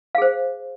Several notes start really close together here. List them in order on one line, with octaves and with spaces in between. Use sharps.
F5 G#4 C5